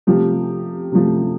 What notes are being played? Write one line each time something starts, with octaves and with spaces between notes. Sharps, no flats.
C3 F3 A3 G4
C3 F3 A3